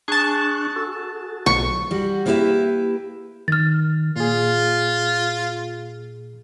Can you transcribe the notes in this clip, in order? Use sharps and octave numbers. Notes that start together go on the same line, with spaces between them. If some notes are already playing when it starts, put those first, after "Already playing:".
D4 G#4 A5 C#6 F#6
F#4 A4
B1 C#6
G3 F#4
A#3 B3 E4 G4 B4 E5
D#3 F6 A6
A#2 F4 G#4